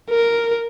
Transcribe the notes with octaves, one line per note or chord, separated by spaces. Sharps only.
A#4